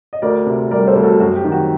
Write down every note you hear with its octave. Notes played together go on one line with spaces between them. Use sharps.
D#5
D2 A#4 D5
C3
G3 A#4 D5
A4 C5
D2
F#4 A4
F#2 F#4
G4
D#3
F#4